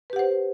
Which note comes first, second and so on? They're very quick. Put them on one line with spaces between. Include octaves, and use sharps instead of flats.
B4 G4 F#5 C5